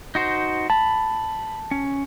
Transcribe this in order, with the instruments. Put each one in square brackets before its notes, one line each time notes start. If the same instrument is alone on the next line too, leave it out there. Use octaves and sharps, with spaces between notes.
[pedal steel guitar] D#4 F#4 C5
[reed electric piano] A5 [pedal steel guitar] B5
[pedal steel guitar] C#4